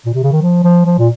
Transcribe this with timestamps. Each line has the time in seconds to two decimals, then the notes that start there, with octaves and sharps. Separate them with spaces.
0.05 A#2
0.14 C3
0.23 C#3
0.32 D#3
0.42 F3
0.64 F3
0.86 F3
0.99 A#2